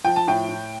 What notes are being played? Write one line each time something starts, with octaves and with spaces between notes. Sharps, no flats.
F3 G5
A5
A2 G5
A2